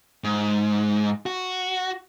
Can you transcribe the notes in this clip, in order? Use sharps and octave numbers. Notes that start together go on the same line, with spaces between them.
G#2
F#4